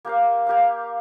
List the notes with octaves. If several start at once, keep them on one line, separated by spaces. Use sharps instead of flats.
A#3 G4 A#4 F5
A#3 G4 A#4 F5